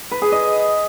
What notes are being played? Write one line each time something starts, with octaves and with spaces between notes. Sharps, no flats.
B4
G#4
D#5